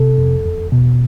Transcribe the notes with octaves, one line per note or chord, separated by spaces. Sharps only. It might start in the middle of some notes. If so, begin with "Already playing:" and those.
Already playing: C3 A4
F2
E2
B2